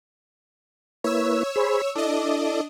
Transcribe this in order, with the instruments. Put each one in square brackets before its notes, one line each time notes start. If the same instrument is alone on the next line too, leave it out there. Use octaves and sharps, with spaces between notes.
[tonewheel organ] A#3 E4 B4 [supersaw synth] C#5 E6
[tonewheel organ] G#4 C5 B5
[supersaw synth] D4 D#5 [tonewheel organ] E4 A4 D6